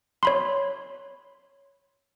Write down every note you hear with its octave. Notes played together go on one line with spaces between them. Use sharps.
C#5 B5 C6